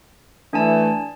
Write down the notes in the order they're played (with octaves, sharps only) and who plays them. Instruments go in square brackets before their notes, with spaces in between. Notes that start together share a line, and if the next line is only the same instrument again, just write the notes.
[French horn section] E3 A3 [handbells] D4 G#5 A5